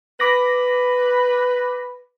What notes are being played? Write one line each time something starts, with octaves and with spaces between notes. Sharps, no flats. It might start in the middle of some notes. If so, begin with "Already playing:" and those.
B4 D6 A#6